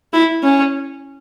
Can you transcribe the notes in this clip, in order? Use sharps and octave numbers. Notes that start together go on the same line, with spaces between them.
E4
C#4